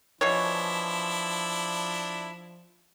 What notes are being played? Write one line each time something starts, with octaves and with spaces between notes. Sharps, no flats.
B2 E3 F3 D4 E4 C#5